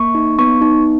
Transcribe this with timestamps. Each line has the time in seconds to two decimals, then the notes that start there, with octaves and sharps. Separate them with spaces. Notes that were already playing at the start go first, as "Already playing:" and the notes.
Already playing: A#3 C#6
0.15 D#4
0.39 B3 C#6
0.62 D#4